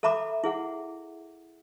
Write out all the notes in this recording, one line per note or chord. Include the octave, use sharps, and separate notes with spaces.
A4 E5 A#5 B5 D6
E4 G#4 F#5